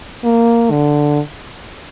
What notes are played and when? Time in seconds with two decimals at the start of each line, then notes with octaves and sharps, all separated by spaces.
0.24 A#3
0.71 D3